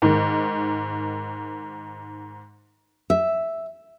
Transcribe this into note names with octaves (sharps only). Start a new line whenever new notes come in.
G#2 D#3
E5